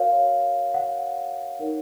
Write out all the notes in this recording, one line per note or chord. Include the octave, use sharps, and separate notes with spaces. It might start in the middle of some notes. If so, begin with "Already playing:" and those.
Already playing: F#4 A#4 C#5 F5
F#5
D#4 A#4 C#5